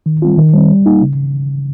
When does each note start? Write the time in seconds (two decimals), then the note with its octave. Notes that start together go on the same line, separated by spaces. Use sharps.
0.06 D#3
0.22 G3 C4 F4
0.38 D#3
0.54 G3 C4
0.71 G3
0.86 A#3 D#4
1.02 C#3